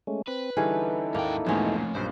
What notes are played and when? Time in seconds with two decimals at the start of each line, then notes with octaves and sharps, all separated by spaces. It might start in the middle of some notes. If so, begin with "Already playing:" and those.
0.07 G#3 A3 C#4
0.28 C4 B4
0.57 D3 E3 G3 C#4 D#4 E4 G#4 A4
1.15 D#2 G#2 A#3 G5
1.46 E2 G#2 B2 F3 A3 C#4 F4
1.95 B1 G2 A#2 C5